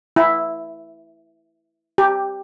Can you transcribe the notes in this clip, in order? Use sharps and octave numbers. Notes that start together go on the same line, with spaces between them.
E4
G4